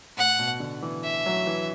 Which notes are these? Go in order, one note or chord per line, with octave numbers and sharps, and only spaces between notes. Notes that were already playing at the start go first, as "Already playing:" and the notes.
A2 F#5
B2
D3
E3
E5
F#3
E3